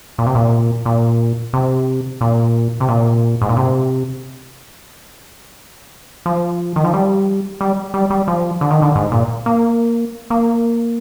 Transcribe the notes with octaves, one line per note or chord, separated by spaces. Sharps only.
A#2
C3
A#2
A#2
C3
A#2
C3
A#2
G#2
A#2
C3
F3
D#3
F3
G3
G3
G3
G3
F3
D3
D#3
D3
G#2
A#2
A#3
A#3